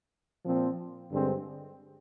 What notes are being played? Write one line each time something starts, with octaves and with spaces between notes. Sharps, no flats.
A#2 F3 C4
G2 D3 G#3 C4